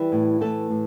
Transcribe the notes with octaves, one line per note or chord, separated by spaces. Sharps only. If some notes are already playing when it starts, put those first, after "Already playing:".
Already playing: E3 G3 E4
A2
E3 A3 A4
A2